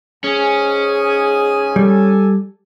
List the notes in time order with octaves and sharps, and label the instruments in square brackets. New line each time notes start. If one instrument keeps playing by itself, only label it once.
[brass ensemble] G#2 G#5 [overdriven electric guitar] C#4 [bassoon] G#4
[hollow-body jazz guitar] G3 [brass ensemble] A4 G#5